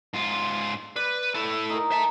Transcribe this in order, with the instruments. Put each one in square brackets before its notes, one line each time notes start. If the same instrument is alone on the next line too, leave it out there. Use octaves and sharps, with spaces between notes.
[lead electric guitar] G#2 F4
[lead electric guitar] B4 [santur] D5
[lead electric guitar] E4 A4
[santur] D#4 A#4
[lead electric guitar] E5 A5